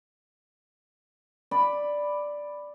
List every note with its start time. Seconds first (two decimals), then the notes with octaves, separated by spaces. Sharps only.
1.51 D5 B5